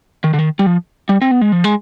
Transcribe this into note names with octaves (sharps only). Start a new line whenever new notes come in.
D#3
D3
D#3
G3
F3
G3
C4
B3
G#3
F3
G#3